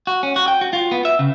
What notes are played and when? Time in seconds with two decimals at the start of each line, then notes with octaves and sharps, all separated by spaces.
0.07 F#4
0.23 C#4
0.36 F#4
0.48 G5
0.61 F#4
0.73 F4
0.91 B3
1.05 E5
1.19 C#3